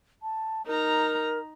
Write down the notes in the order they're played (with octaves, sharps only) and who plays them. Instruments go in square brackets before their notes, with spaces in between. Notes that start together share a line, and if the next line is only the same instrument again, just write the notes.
[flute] A5
[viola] D#4 A#5 [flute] A#4